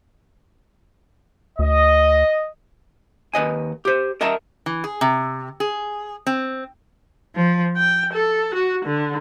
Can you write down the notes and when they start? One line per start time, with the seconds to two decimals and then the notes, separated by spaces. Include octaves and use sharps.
1.59 D2 D#5
3.34 D#2 B4 D#5 G#5
3.85 G4 C5
4.21 A#4 D#5 E5 A5 A#5
4.66 E3
4.84 G#4
5.01 C3
5.60 G#4
6.27 C4
7.37 F3
7.76 G5
8.12 A4
8.54 F#4
8.85 D3